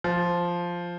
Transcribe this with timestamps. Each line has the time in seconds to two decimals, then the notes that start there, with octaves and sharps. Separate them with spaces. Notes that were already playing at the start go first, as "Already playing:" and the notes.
0.04 F3